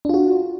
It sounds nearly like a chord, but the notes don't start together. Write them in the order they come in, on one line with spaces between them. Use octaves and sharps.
D4 F4 F#4